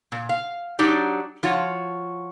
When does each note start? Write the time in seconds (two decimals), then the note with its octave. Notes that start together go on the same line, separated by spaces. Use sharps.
0.12 A#2
0.29 F5
0.79 F#3 D4 D#4 G4 D5
1.43 F3 F4 F#4 C#5